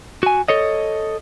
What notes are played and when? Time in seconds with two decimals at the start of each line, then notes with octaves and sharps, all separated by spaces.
0.23 F#4 G#5
0.48 A4 C#5 D#5